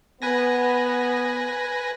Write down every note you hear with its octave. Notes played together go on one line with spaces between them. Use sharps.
B3 B4 G#5 A#6